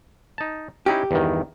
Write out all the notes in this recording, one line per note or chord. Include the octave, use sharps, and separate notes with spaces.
D#4 A5
C#4 D#4 E4 G4
E2 G2 D#3